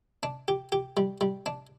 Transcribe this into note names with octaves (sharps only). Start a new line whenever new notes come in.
D4
G4
G4
G3
G3
D4